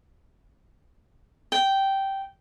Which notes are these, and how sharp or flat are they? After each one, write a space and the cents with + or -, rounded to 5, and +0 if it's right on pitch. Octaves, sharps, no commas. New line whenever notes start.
G5 -10